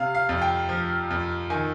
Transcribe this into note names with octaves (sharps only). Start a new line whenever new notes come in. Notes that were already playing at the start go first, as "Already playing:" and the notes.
Already playing: C3 F5
F5
F2
G5
F3
F2
D#3 G#5